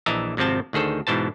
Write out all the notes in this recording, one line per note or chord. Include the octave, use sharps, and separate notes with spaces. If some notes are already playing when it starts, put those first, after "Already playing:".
A#1 E3 D#5 E5 A5 A#5
G#1 C3 F3 C4 A5
D2 D#3 G#4 A4 C5
G#2 B2 E3 C5 A5